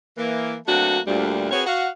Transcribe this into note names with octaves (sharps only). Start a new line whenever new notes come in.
E3 A#3
F#3 A3 A#3 C4 D4 F#4
D2 A#2 G3
C4 F#4 G#4 B4 C#5
F#4 F5 F#5